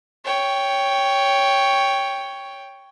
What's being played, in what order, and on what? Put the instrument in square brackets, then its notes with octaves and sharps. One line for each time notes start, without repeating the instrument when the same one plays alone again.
[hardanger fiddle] C#5 G5